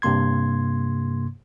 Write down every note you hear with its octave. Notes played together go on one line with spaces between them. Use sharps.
G2 C3 A#3 C6 G#6